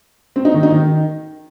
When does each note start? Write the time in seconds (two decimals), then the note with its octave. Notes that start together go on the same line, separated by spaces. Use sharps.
0.36 C4
0.45 D#4
0.54 D#3
0.63 D#4
0.72 D#3